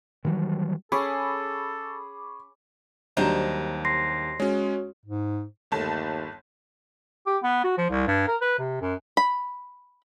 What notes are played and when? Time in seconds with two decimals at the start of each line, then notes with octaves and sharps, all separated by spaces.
0.25 D#3 E3 F#3 G3
0.92 C#4 G#4 A4 B5 C#6 D6
3.17 D#2 F#3 G3 D4 C5 D#5 A#5
3.85 C6 A#6 C7
4.40 G#3 C#4 F#4 C#5
5.06 G#2
5.72 G1 D#2 A3 A5
7.27 G4
7.43 B3
7.64 F#4
7.78 F3
7.90 C2
8.07 G2
8.28 A#4
8.41 B4
8.59 C3
8.81 F#2
9.17 B5